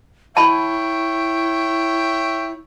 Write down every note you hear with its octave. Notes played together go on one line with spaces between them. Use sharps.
E4 C#5 E5 G5 A5 B5